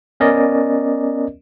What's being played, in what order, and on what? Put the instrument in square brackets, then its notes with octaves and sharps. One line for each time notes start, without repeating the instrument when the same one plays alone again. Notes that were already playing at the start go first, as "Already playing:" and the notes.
[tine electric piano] B3 C#4 A#4 D5 D#5